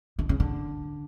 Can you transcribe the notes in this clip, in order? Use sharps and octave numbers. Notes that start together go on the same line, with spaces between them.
D3
C#3
D3